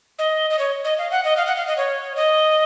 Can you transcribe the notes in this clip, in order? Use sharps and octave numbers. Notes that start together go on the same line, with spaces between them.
D#5
D#5
C#5
D#5
F5
F#5
D#5
F5
F#5
F5
D#5
C#5
D#5